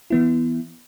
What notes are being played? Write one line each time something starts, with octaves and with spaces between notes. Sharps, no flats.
E3 B3 E4